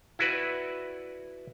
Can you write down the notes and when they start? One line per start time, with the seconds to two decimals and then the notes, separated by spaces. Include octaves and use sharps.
0.19 E4 F#4 B4 D5